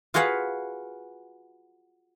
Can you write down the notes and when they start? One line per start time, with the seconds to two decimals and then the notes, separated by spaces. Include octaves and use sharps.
0.14 F4 F#4 G#4 B4 F5 F#5